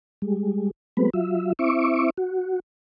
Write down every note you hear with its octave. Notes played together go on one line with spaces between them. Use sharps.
G3 G#3
F#3 G#3 A3 B3 C4 B4
F#3 F4 E5
C4 E4 E5 C#6 D6
F#4